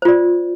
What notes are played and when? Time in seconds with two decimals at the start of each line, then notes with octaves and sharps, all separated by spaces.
0.02 C5
0.05 F4
0.08 D5